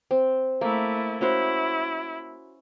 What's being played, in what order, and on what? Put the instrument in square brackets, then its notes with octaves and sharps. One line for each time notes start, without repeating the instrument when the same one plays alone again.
[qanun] C4
[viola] A3 E4 [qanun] A#3
[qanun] C#4 F#4 C5 [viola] E4